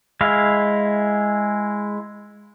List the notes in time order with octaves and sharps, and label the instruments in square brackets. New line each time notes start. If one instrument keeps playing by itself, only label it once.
[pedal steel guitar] G#3 E4 F5